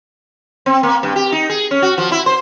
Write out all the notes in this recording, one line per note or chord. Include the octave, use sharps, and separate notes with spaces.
C4
A#3
G2
G4
D#4
G#4
C#4
F#4
F3
E4
C5